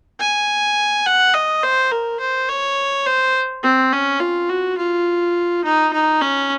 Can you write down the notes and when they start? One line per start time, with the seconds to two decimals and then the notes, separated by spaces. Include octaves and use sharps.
0.20 G#5
1.06 F#5
1.34 D#5
1.63 C5
1.92 A#4
2.20 C5
2.49 C#5
3.06 C5
3.63 C4
3.93 C#4
4.20 F4
4.49 F#4
4.78 F4
5.64 D#4
5.93 D#4
6.21 C#4